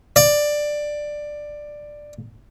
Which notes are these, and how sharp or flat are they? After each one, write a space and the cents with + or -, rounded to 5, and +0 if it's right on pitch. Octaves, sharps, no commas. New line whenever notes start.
D5 +10